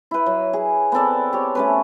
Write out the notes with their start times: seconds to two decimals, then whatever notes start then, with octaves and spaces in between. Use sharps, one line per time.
0.11 E4 B4
0.26 F#3
0.53 G#4
0.92 B3 C4 A4 D5
1.33 G4 C#5
1.55 A3 C#4 B4